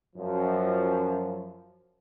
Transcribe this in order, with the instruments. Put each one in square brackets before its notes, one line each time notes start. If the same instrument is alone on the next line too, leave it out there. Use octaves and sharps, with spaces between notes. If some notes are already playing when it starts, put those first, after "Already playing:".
[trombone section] F#2 F3